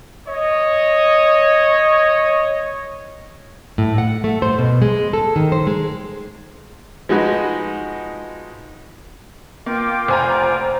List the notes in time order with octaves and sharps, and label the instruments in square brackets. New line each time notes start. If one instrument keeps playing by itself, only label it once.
[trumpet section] C#5 D#5
[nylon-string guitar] A2
F#5
A3
C5
B2
G#3
A4
D#3
C5
G#3
[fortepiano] F3 G#3 D#4 F#4 B4
[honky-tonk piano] A#3 [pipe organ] F4 G5 D6
[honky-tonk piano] F1 G#5 A#5 [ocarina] C5